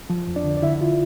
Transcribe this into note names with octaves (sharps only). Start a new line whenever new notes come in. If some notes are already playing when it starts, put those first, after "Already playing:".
F3
F2
D4 D5
D3
D5
D3 E4 E5
F4